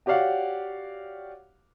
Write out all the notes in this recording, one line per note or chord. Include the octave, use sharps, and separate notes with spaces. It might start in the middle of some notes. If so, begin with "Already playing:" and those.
F#4 G4 C#5 D5 F5 F#5